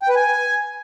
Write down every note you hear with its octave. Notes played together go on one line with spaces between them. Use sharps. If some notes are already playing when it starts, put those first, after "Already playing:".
G5
B4
G#5